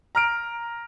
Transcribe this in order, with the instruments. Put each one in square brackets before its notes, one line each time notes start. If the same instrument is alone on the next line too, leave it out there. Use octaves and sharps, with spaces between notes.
[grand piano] A#5 F6 D7